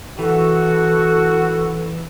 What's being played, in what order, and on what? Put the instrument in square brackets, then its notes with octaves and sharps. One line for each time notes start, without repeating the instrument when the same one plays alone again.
[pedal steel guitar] E3 [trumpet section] F#4 [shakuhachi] A4